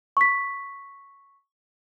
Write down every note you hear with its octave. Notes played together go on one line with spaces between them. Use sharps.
C#6 B6